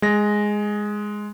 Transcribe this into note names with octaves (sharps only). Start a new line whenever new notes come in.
G#3 A#6